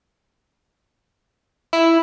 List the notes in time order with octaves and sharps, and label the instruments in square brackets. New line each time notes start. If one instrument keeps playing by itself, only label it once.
[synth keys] E4